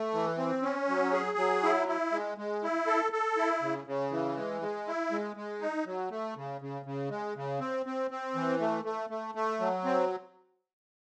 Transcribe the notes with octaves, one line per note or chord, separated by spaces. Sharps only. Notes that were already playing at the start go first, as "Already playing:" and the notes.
Already playing: A3
E3
C4
C#4
F#3
G#4
F#3
E4
E4
G#3
G#3
E4
A4
A4
E4
C#3
C#3
E3
G#3
G#3
E4
G#3
G#3
D#4
F#3
A3
C#3
C#3
C#3
G#3
C#3
C4
C4
C4
E3
A3
A3
A3
A3
F#3
C4